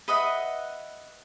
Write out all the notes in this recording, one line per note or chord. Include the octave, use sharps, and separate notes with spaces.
B4 D#5 E5 F#5